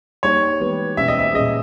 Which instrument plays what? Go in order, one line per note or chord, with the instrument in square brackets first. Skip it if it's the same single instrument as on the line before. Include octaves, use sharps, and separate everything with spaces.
[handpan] G3 A#3 D#4 G4 [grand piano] C#5
[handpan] E3 G#3 B3 G4 B4
[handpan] B2 G3 C#4 G4 [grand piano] E5
[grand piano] D#5
E5
[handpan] A#2 G3 C#4 G#4 [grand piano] D#5